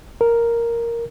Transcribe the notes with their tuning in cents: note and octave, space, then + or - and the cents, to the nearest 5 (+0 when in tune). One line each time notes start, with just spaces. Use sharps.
A#4 +0